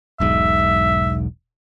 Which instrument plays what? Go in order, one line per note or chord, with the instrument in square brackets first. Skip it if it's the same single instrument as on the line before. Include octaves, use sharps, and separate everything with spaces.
[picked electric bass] E1 B1 G#2 [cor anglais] E5